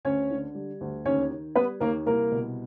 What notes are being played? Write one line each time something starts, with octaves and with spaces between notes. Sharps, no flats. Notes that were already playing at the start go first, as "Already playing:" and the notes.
D2 C#4 C#5
D3
G3
D2
D#2 C#4 C#5
D#3
G3 B3 B4
D#2 A#3 A#4
C2 A#3 A#4
B2